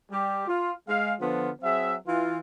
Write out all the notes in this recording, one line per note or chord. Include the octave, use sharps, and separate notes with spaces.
G3 G4
F4
G#3 F5
D3 F3 B3 F4
F#3 C4 G#4 E5
E3 F4